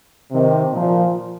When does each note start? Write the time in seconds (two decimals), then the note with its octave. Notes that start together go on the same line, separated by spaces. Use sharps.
0.30 C3 D#3
0.71 A#2 F3